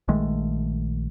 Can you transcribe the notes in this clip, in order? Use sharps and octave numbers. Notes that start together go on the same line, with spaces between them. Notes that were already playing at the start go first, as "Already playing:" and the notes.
A#1 D#3 G#3 A3